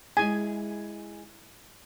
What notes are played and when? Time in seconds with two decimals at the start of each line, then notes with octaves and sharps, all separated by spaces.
0.17 G#3 E4 G#4 G#5